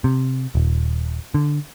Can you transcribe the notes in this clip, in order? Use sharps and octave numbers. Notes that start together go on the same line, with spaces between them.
C3
D#1
D3